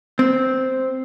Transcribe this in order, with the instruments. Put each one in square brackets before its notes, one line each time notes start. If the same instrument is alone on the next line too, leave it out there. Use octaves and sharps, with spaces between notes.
[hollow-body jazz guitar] C4